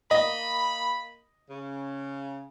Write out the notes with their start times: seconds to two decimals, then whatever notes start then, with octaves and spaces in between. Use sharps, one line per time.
0.11 A#3 D#5 B5
1.50 C#3